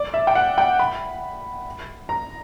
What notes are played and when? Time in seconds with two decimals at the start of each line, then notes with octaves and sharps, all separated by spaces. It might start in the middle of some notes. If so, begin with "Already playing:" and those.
Already playing: D5
0.14 E5
0.27 G5
0.35 F#5
0.58 G5
0.79 B5
2.09 A#5